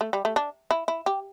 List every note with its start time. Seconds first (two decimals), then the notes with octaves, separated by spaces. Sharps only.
0.01 A3
0.13 G3
0.25 A3
0.36 D4
0.71 E4
0.88 E4
1.06 G4